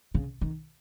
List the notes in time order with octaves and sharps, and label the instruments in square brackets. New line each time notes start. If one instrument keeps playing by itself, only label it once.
[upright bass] C#3
D#3